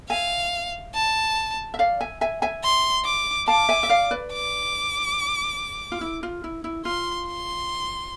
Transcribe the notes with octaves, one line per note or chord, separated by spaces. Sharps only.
E5 F5 G#5
A5
E5
D5 F5
E5 G#5
E5 G#5
E5 G#5
C6
D6
F5 A5 D6
E5 G#5
E5
D5 F5
B4 D5
D6
F4
E4
F4
E4
E4
F4 C6
C6